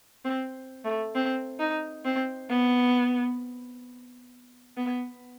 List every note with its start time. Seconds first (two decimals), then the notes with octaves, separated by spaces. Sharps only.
0.25 C4
0.84 A3
1.15 C4
1.59 D#4
2.05 C4
2.50 B3
4.77 B3